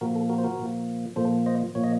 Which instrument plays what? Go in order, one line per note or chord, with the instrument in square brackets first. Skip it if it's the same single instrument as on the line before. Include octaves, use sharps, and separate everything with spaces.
[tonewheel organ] A#2 F3 A#3 F#4 A#4
A4
F#4 A#4
C5
F#4 A#4
A#2 F3 A#3
A#2 F3 A#3 A4 C5
C5 D#5
A#2 F3 A#3 C#5
D#5